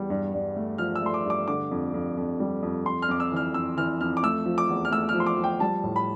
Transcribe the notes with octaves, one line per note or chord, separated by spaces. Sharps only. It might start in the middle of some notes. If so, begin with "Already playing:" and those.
Already playing: E2 G3
G2
G2
A3
F3 F6
E6
A3 C6
D6
G2
D6
D3 D6
F2
F2
F2
G3
F2
F2 C6
F6
F2 D6
E6
E3 F6
F2 E6
E3 F6
F2 F6
D6
A3 E6
F3
D6
E2
F6
A3 E6
F6
F3
C6
D6
F3
G5
G3 A5
A2
B5